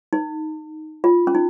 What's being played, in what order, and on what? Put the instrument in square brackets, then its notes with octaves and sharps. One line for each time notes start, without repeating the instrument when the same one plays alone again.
[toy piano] D#4
F4
C#4
D#4